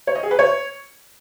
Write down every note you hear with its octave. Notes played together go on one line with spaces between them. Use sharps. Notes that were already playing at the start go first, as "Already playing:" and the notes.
C#5
D#5
G#4
B4
C#5